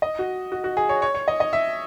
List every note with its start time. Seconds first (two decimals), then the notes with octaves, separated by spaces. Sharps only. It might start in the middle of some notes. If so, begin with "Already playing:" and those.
0.02 D#5
0.19 F#4
0.52 F#4
0.64 F#4
0.77 G#4
0.89 C#5
1.02 C#5
1.14 C#5
1.28 D#5
1.40 D#5
1.53 E5